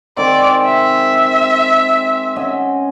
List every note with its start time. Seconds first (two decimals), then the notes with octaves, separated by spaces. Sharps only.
0.17 D#3 G#3 C4 D5
0.65 E5
2.36 C#4 D#5 F#5